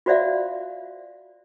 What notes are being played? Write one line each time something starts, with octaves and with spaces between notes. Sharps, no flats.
F4 F#4 C5 D5 E5 F5